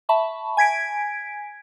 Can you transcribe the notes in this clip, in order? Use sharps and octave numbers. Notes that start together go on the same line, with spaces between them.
E5 A5 B5 C#6
G#5 G#6 B6 D7